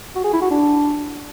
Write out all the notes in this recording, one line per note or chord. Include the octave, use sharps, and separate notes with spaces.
F#4
G#4
E4
F#4
D4